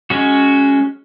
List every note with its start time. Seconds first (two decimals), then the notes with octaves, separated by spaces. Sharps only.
0.10 G#3 C#4 F#4